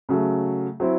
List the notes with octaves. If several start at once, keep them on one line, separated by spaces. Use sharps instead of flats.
C#3 F#3 A3
F#3 C4 E4